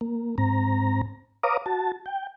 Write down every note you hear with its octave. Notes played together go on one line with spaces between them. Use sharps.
A#3
G#2 C4 A#5
B4 C#5 F5 A#5 D6 D#6
F#4 A5
G5